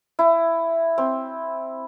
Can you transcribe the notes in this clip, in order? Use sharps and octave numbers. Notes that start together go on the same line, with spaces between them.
E4
C4